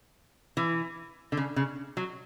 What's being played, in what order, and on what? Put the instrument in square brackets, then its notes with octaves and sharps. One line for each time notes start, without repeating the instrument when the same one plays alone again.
[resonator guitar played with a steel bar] E3
D3
C#3
C#3
F#3